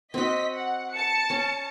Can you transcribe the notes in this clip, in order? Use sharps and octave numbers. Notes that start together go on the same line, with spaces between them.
C4 F#4 D#5 B6
F#5
A5 C#7
C#4